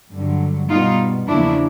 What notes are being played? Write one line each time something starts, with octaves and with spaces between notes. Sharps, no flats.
G2 D3 F#3
B2 G3 B3 D#4 F4
E2 C#3 F3 A#3 D4 E4